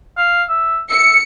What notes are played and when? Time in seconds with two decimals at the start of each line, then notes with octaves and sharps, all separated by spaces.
0.17 F5
0.49 E5
0.90 E5 C#7